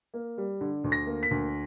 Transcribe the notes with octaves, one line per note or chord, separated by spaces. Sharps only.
A#3
G3
D3
D2
A#6
A#3
B6
D2